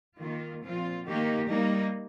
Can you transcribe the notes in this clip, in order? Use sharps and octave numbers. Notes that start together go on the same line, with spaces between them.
D#3 A#3 F4
A#2 F3 C4 F4
D#3 A#3 D#4 G4
G3 A#3 D#4